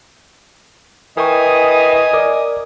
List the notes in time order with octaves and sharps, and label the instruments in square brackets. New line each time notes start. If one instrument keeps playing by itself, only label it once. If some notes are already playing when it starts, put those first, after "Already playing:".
[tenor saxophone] E3 [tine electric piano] A#4 G5 C#6 [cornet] D#5 [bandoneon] G#5 D#6
[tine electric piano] A#4 D5 D6